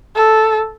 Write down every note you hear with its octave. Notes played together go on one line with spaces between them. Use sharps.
A4